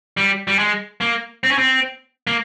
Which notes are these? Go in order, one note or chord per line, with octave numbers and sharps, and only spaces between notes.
G3
G3
G#3
A#3
C4
C#4
C4
A#3